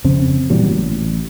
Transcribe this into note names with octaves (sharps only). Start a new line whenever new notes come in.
F2 C#3 C4
A#2 E3 F#3 G3
A1